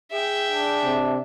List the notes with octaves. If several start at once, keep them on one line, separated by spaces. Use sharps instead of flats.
G#4 E5 G5
D4
C3